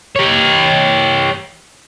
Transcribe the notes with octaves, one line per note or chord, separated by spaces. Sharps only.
G4 C#5